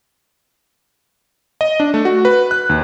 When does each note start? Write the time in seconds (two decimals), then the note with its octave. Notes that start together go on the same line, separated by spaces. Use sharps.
1.61 D#5
1.80 D4
1.94 A3
2.05 F#4
2.25 B4
2.51 F#6
2.69 D#2